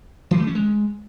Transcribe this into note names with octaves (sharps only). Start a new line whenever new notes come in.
E3
A3
C#4
G#3